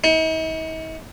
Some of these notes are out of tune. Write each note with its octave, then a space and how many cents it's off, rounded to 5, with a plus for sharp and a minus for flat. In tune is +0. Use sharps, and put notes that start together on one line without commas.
D#4 +45